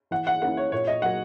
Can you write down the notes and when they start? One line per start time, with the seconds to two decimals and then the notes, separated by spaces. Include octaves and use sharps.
0.11 E3 F#5
0.27 F#5
0.42 A#3 C#4 E4 F#5
0.57 C#5
0.72 A#2 C#5
0.87 D#5
1.02 F#3 A#3 F#5